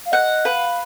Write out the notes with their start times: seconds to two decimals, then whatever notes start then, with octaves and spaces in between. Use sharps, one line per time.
0.05 F5
0.12 D#5 F#5
0.45 B4 F5